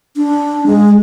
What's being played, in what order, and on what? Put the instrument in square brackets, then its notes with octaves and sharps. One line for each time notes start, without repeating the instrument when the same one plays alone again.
[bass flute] D4
G#3